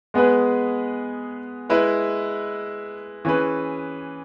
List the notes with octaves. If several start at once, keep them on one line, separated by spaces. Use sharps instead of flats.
G#3 B3 G#4 B4
G#3 E4 B4
E3 C#4 G#4 B4